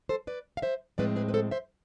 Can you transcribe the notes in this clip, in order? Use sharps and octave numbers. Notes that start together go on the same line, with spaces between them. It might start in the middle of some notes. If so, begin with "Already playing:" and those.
A4 C5
B4 D5
F5
C5 E5
A2 F3 G#3 C4 B4 D5
G#4 B4
B4
A4 C5
C5 E5